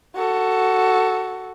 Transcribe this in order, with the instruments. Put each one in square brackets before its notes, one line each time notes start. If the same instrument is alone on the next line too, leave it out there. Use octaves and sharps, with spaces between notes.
[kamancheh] F#4 A4